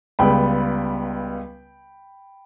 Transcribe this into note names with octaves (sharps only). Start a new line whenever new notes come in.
C#2 C#3 G3 B3 G5 B5